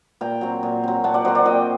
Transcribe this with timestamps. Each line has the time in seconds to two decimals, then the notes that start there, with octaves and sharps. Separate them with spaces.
0.21 A#2 G5 A#5
0.41 F#3 C4
0.63 A#2
0.83 F#3 C4
1.04 A#2 F#5 A5
1.14 D5 F#5
1.25 F#3 C4 C5 D#5
1.35 D5 F#5
1.45 A#2 D#5 G5